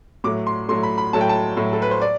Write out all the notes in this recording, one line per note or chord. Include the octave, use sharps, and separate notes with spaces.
A2 F#3 A3 D6
C6
A2 F#3 A3 C6
B5
B5
A2 F#3 A3 A5
G5
A5
A2 F#3 A3
A4
B4
C5
D5